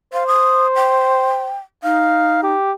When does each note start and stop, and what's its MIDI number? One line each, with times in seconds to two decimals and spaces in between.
0.13 1.55 72
0.13 0.27 77
0.27 0.67 87
0.75 1.57 79
1.84 2.53 63
1.84 2.42 77
2.43 2.72 67